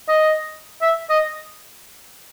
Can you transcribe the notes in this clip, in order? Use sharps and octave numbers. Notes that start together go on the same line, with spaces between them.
D#5
E5
D#5